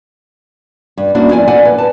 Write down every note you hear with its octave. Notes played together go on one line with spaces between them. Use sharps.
G2
A#3 C#4 D4 E4 F#4
E2 F3 E4 D5 G#5
A4 D5 F#5 G#5
B4
A5